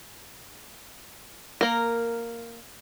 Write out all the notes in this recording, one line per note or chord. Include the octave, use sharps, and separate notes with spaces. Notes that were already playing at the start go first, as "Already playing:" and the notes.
A#3 A#4